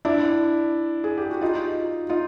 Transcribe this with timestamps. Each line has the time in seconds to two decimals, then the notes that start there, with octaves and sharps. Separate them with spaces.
0.05 D4 E4
1.04 G#4
1.18 G4
1.30 F#4
1.41 D#4 F4
2.09 D#4 F4